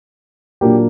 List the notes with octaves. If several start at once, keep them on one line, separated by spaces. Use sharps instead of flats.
A#2 F#3 A#3 D4 G4